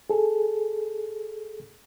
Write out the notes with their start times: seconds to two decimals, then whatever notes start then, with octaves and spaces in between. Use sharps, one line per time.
0.10 G#4 A4